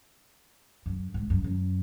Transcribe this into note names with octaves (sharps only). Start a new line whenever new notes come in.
F#2
G#2
F#2
F#2